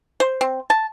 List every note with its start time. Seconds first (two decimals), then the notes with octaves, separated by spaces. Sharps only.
0.20 C5
0.41 C4
0.70 A5